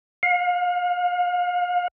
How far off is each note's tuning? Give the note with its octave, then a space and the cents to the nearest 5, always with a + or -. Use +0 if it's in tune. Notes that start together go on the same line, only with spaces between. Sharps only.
F5 +35